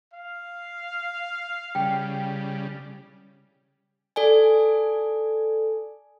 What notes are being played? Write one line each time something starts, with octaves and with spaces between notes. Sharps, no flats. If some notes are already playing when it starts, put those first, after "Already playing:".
F5
C#3 G3 G5
A4 D5 G#5